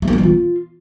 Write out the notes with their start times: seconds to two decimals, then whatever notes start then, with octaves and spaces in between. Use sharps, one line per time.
0.02 A3
0.08 A#3
0.13 G3
0.18 E3
0.23 F4